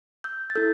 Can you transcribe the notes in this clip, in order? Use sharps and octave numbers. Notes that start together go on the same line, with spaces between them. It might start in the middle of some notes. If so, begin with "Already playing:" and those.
E6 G6
A6
E4 A4 E6 G6